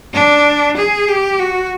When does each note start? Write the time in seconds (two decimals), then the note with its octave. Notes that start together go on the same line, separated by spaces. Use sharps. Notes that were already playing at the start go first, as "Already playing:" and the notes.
0.14 D4
0.77 G#4
1.09 G4
1.40 F#4